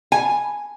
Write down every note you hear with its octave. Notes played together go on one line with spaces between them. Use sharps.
G#5